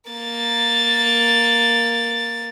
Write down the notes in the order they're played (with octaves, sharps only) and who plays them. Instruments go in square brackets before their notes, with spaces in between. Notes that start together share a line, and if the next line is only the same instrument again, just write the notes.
[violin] A#3 A6